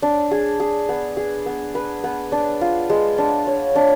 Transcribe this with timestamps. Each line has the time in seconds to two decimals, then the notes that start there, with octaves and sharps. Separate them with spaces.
0.02 D4
0.31 G#4
0.60 G#4
0.89 B3
1.17 G#4
1.46 B3
1.75 B4
2.04 B3
2.32 D4
2.61 F4
2.90 G#3
3.18 D4
3.47 C#5
3.76 D4